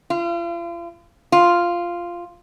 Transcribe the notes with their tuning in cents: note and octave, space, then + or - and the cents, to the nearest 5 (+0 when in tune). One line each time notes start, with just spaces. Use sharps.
F4 -40
F4 -5